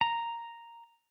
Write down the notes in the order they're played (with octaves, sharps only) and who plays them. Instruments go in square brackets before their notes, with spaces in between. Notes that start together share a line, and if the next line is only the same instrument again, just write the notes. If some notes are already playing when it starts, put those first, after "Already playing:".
[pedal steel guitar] A#5